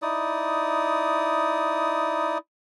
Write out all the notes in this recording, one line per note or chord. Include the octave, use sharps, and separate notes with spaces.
D#4 E4 D5 D#6